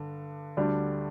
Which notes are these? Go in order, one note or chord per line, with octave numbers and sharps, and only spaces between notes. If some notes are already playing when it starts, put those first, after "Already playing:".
Already playing: G2 D3
D2 D3 G3 D4